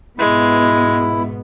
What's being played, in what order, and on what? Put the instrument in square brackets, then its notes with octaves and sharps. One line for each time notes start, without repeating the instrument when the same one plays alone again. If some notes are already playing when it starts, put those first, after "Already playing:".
[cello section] G#2 B2 B3 [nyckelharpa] G#3 [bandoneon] E4